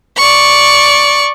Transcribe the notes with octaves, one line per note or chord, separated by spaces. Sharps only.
D5 C#6